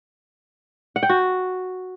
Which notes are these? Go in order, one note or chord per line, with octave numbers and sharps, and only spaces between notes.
F#5
G5
F#4